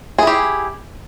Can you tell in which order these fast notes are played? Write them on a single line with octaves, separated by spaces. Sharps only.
G#4 E4 G4